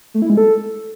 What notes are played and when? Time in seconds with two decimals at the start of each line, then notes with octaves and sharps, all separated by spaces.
0.14 A3
0.22 E4
0.30 G#3
0.37 A4